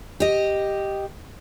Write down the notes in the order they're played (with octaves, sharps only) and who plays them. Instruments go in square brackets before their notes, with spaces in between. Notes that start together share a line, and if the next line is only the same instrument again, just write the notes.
[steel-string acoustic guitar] G4 D#5